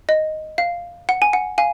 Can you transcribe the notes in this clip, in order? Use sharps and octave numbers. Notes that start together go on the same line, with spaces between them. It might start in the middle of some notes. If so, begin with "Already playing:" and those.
D#5
F5
F#5
G#5
F#5
F5 G#5